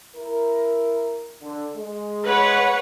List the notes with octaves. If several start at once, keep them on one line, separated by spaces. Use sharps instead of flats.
E4 A#4
D3
G#3
B4 C#5 F#5